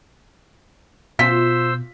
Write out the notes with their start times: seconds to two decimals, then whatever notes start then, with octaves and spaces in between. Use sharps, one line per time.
1.19 B2 F4 C5 E6 B6